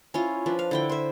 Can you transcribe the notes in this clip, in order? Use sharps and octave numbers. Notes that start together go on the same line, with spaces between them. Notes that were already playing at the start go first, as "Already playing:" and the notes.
C#4 E4 F4
F3 D4 B4
F5
D3 E4 G5
C5 E5